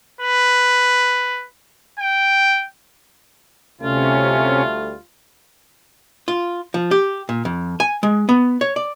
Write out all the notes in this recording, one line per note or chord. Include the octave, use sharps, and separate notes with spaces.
B4
G5
D2 C3 G3 A3 C#4 F4
F4
F3
G4
A#2
F2
G#5
G#3
B3
C#5
D5